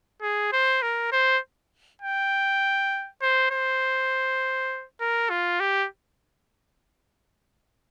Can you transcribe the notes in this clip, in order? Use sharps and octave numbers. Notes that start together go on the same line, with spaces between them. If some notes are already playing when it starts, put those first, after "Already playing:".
G#4
C5
A#4
C5
G5
C5
C5
A#4
F4
G4